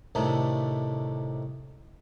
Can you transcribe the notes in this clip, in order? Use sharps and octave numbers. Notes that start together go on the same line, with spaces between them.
A2 C3 D#3 A3 D4 D#4